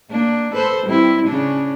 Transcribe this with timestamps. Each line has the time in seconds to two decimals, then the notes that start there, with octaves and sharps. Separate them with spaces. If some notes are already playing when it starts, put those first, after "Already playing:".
0.11 A#3 D4
0.53 A4 B4 C5
0.86 G3 C4 E4
1.27 C#3 C#4 D4